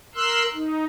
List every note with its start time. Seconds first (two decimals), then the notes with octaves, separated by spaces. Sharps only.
0.15 A#4 C6 E6 F#6
0.54 D#4